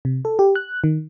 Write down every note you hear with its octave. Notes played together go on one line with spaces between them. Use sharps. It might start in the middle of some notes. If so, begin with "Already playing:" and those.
C3
A4
G4
F#6
D#3